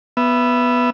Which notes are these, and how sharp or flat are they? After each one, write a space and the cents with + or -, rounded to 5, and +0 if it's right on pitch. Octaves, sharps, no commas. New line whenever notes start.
B3 +0 E5 +25